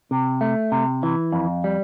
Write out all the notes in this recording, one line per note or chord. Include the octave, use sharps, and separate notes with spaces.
C3
A3
C3
E3
F2
G3